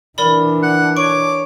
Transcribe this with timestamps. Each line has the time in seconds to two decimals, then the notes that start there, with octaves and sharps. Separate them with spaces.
0.18 E3 D4 A#4 D5 B5
0.63 F#5
0.97 C#5 C#6 D6